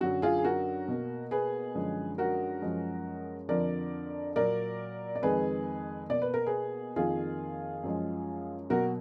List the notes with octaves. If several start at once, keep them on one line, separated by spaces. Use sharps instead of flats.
F#2 D3 F#3 F#4
F4 G#4
G#4
F#4 A#4
B2 A#3
G#4 B4
F#2 D3 F3 G#3
F#4 A#4
F#2 F3 G#3
F2 D3 F3 A#4 D5
A#2 F#3 A#3 A#4 D5
D5
F2 D#3 G#3 G#4 B4
B2 A#3 D5
B4
A#4
G#4 B4
F2 D#3 A#3 F4 G#4
F#2 F3 G#3
B2 F#3 A#3 F#4 A#4